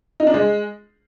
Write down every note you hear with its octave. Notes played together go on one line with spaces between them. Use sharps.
D#4
D4
G#3